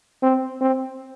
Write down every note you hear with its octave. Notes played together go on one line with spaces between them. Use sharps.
C4
C4